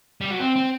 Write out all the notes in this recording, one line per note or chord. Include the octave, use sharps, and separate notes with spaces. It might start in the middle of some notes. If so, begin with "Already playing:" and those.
G3
F#3
C4
C4